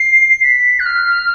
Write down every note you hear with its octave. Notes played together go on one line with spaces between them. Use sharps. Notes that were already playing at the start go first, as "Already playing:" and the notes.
Already playing: C7
B6
F#6
F6